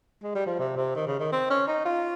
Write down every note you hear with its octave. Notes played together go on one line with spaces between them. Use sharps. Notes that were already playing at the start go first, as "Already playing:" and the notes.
G#3
G3
F3
C3
C3
D#3
C#3
D#3
C4
C#4
D#4
F4